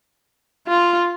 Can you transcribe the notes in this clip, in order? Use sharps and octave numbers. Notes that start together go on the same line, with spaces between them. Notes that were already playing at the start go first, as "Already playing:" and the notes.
F4